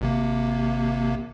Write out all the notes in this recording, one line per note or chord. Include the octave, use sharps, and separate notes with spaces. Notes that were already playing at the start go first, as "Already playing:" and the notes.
G#1 C3 A#3